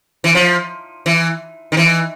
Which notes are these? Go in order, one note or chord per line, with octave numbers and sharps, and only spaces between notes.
E3
F3
E3
D#3
E3